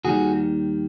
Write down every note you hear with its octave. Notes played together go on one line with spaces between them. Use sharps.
D#2 D#3 G3 F#4 G#4